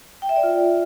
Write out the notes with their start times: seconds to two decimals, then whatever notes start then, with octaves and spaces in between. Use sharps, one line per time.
0.22 G5
0.29 E5
0.36 D5
0.43 F4